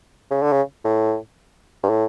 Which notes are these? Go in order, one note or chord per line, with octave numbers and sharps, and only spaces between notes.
C#3
D3
C#3
A2
G2
A2